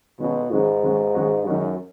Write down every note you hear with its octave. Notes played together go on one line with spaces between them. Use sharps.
B2 D#3 G#3 C#4 F#4
G#2 D#3 G#3 C#4 F#4
D#3 G#3 C#4 F#4
D#3 G#3 C#4 F#4
F#2 D#3 G#3 D#4 F#4